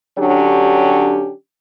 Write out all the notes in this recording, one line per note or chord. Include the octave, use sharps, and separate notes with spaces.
D3 F#3 C#4 D4 G4